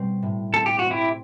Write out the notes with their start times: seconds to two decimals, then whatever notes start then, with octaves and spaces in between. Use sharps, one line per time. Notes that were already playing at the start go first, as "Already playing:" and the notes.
Already playing: B2 G3 C4
0.23 A2
0.53 C4 A4
0.66 G4
0.79 F#4
0.84 C4
0.91 E4 G4